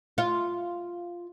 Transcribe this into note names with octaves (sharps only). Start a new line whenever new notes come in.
F4